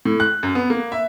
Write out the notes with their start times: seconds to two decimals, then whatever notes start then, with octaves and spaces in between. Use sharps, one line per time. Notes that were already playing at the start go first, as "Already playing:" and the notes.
0.05 A2
0.20 F#6
0.43 F#2
0.55 B3
0.70 A#3
0.92 E5